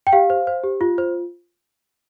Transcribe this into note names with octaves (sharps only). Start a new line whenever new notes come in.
G5
G4 F5
C5
C5
G4
F4
C5